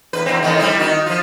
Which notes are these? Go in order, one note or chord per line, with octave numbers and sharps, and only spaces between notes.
E2 B4
E2 C4
A2 D#3 E3
G3 C4 E4
D#3 F#4
F3 F4